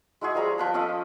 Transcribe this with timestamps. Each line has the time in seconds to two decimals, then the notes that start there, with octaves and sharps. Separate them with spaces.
0.21 G#3 E4 F#4 G#4
0.35 F3 G3 A#5 B5
0.58 F3 B4 A5
0.74 C#4 A4 D#5 F5